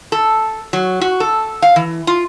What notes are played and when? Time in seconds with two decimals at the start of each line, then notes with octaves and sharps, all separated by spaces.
0.12 A4
0.73 F#3
1.01 F#4
1.20 A4
1.62 F5
1.76 E3
2.07 F4